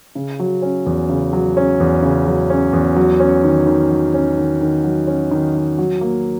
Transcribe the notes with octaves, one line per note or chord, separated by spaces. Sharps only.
C#3
F#3
C#4
E2
C#3
F#3
C#4
E2
C#3
F#3
C#4
E2
F#3
C#4
D#3
D#3
F#3
C#4
D#3
D#3
F#3
C#4
D#3
D#3
F#3
A#3